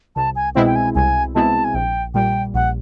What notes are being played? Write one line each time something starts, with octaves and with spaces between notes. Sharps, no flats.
C2 A5
G#5
B2 G#3 C4 E4 G5
G5
G#5
C2 G#5
B2 G#3 C4 E4 A5
G#5
A#1 G5
A#2 G3 G5
A#1 F#5